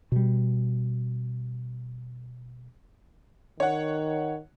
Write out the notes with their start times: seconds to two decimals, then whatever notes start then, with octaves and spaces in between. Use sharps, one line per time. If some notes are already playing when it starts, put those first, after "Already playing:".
0.12 B2 G3
3.60 D#3 C#5 F#5